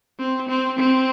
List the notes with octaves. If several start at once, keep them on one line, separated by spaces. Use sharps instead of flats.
C4
C4
C4